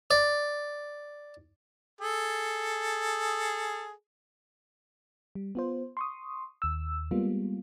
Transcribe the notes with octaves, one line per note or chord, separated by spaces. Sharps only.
D5
G#4 A4
G3
B3 F4 C5
C6 C#6 D#6
D#2 E6
G3 G#3 A#3 B3 F4